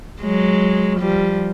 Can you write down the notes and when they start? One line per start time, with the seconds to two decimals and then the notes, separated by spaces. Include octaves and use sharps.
0.21 F#3 G#3
1.00 F3 G3